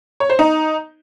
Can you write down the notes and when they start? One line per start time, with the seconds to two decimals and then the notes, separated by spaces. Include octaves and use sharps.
0.20 C#5
0.30 C5
0.39 D#4